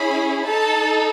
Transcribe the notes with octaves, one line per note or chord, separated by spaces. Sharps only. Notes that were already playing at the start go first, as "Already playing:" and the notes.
Already playing: C#4 E4 G#4 B5
D#4 A4 A5